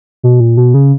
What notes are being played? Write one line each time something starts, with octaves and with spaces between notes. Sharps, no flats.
B2
A#2
B2
C#3